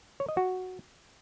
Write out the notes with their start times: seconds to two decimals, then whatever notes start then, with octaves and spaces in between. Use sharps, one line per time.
0.20 C#5
0.29 D#5
0.37 F#4